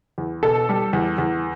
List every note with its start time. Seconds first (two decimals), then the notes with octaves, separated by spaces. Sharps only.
0.18 E2
0.43 B2 A4
0.69 G3
0.93 E2
1.18 E2